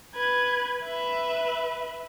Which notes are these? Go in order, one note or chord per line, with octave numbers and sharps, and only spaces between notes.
B4 G#6
B4 E5